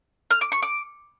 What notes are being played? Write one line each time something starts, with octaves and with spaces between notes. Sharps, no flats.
F6
D6
C#6
D6